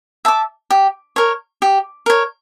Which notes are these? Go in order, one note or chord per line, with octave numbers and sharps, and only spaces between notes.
E5 A5 D6
G4
A#4 C#5
G4
A#4 C#5